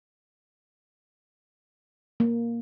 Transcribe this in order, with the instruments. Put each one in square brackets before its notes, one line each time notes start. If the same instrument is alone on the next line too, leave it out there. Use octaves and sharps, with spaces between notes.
[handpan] A#3